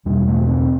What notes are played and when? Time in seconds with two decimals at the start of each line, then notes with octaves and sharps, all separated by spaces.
0.05 E2 B2 G3
0.28 A3
0.49 C4